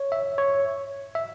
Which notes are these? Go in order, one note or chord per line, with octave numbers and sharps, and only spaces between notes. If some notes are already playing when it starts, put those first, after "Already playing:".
Already playing: C#5
E5
C#5
E5